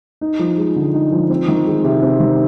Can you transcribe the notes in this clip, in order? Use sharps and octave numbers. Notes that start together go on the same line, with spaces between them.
D#4
F3
G#3
D3
D#4
F3
C4
D#3
G#3
C3
C4
D#3